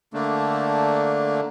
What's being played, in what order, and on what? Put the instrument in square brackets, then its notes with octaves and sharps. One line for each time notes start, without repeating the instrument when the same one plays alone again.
[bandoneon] D3 A3 A#3 D4